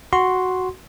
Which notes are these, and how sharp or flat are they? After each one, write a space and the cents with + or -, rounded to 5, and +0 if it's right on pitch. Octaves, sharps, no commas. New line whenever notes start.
F#4 +0 C6 +0